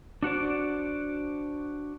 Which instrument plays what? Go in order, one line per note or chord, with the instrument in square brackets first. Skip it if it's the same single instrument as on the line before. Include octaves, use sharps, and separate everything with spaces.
[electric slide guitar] D4 F#4 C5 D5